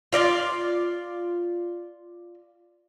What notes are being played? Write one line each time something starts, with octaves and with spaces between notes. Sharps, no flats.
F4 D5 D#5 F5